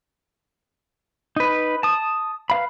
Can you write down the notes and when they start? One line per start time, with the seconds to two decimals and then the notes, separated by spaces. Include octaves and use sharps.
1.36 D#4 B4
1.83 A5 D#6
2.50 B4 F5 B5